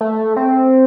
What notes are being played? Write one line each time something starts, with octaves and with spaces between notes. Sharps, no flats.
A3
C4